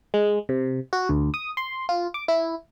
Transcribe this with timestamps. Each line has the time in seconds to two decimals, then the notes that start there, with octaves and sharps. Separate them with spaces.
0.14 G#3
0.49 C3
0.93 F#4
1.09 D2
1.34 D#6
1.57 C6
1.89 F4
2.14 D6
2.28 E4